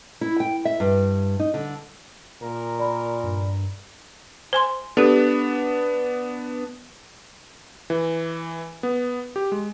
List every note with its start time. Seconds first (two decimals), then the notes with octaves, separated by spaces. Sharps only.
0.21 E4
0.40 G5
0.65 E5
0.80 G2
1.40 D#4
1.54 D3
2.42 A#2 A#4
2.79 D5 B5
3.24 G2
4.53 C5 G#5 C6
4.97 B3 D4 G4 A4
7.90 E3
8.83 B3
9.36 G4
9.52 G#3